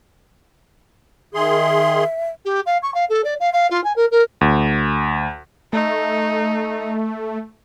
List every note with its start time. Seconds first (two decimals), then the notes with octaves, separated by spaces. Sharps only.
1.34 D#3 G#4 E5 C6
2.45 G4
2.66 F5
2.82 C#6
2.94 F5
3.09 A4
3.24 D5
3.40 F5
3.53 F5
3.70 F4
3.84 G#5
3.96 A#4
4.11 A#4
4.41 D2
5.73 A3 D#4